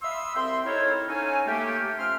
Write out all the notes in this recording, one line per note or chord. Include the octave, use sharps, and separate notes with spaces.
E5 F5 B5 C6 D#6 E6
C2 C4 E5 G5 C6
D#4 E4 A4 A#4 C5 C#5
C#4 D#4 A4 C#5 F5 G#5
A3 A#3 G4
F3 C#4 E5 C6 F6